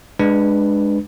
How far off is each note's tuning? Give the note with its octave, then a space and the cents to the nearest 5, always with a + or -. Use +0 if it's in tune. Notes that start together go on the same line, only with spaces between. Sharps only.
G#3 +0 D4 +20 B4 +0